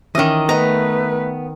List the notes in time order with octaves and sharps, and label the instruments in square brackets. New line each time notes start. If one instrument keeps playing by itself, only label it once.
[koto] D#3 D#5 [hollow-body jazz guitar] E3 C#4
[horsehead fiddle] A3 B4 [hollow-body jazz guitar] B3 D#5 [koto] A#5